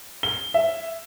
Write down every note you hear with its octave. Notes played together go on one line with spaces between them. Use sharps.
G7
E5